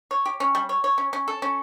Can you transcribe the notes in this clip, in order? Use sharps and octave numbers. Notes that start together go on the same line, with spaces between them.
C#5
G4
C#4
G3
C#5
C#5
C#4
C#4
A4
C#4